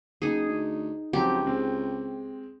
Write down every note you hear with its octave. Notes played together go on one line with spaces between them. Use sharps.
F#1 D#4 G#4
D2
C#2 F3 F#3 C4 G4
G#3 C4